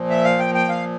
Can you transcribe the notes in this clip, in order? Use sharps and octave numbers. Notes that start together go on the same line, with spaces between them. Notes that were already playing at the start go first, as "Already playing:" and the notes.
Already playing: A#2 F3
E5
F5
G5
G5
F5